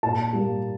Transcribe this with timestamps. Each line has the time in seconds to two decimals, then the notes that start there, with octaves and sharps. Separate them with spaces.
0.03 A#2 A5
0.33 G3 A#3